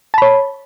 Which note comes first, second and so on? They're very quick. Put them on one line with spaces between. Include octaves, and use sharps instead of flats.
A5 B5 C#5